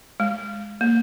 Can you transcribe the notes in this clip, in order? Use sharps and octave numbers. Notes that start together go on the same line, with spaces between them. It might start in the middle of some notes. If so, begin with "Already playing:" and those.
G#3
A#3